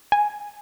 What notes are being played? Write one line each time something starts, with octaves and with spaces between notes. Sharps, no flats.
G#5